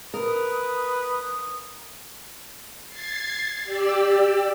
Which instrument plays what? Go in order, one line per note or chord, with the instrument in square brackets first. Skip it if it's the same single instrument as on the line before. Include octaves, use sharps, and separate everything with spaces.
[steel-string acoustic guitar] A#4 [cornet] B4 [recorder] D#6
[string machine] G#6 A6 C7
G4 D5 E6